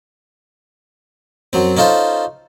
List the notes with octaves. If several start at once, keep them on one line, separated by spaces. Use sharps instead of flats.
F#2 F#3 C4
C#4 D#4 F4 A4 C5